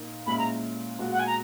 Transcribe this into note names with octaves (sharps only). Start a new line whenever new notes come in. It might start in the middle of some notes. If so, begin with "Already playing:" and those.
Already playing: A#2 A#3 D#4
A#2 G#3 C#4 E4 B5
A#5
A#2 G#3 B3 F#4
F#5
G#5
A#5